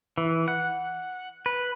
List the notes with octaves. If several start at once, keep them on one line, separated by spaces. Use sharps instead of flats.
E3
F#5
B4